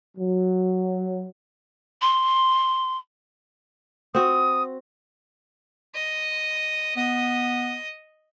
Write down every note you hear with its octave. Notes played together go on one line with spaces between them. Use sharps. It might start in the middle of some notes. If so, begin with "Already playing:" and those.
F#3
C6
C4 F#4 D#6
D#5
B3 D#5